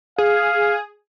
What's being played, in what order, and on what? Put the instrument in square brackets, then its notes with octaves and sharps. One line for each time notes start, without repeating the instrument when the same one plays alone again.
[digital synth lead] G#4 [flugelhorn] F5